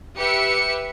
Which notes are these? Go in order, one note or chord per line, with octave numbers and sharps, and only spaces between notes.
G4 B4 E5 C#7